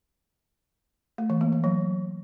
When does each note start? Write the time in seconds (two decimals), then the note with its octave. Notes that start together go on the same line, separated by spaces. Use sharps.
1.18 A3
1.30 E3
1.41 A#3
1.52 E3
1.64 F#3